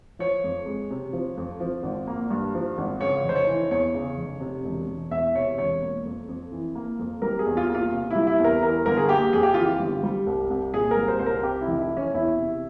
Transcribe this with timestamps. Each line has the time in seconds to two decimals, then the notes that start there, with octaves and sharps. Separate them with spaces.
0.19 F3 C#5
0.44 F2
0.66 G#3
0.91 C3
1.13 F3
1.37 F2
1.60 F3
1.83 G#1
2.07 A#3
2.30 G2
2.54 F3
2.78 G#1
3.01 C#3 C#5
3.24 F1 C5
3.36 C#5
3.47 E3
3.71 E2 C#5
3.94 C#3
4.17 F1
4.41 C3
4.65 E1
4.88 E1
5.11 E2 E5
5.35 C3 C#5
5.58 E1 C#5
5.82 A#3
6.05 F2
6.28 F2
6.52 E3
6.75 A#3
6.99 F2
7.22 G3 A#4
7.39 G#4
7.46 E2
7.57 F4
7.70 A#3
7.75 F4
7.92 C3
8.10 E4
8.16 G3
8.27 E4
8.39 E2
8.44 A#4
8.62 E3 A#4
8.86 G1 A#4
8.97 G#4
9.09 A#3 G4
9.33 F2 G#4
9.43 G4
9.54 E3 F4
9.65 G4
9.80 G1
10.03 G3
10.27 C2
10.50 C2
10.74 A#2 G#4
10.91 A#4
10.96 G3
11.08 C5
11.19 C2 C5
11.26 A#4
11.43 C3 G4
11.61 E4
11.68 F1
11.78 E4
11.90 E3
11.97 C#4
12.14 E2 E4
12.37 C3